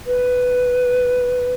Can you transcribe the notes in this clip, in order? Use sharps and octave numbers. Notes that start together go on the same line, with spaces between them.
B4